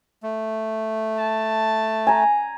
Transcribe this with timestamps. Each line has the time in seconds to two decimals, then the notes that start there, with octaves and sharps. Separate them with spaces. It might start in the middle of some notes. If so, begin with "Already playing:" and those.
0.23 A3
1.18 A5
2.07 G#5 A#5